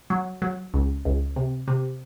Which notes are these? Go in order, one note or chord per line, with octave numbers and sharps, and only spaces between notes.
F#3
F#3
C#2
C#2
C3
C3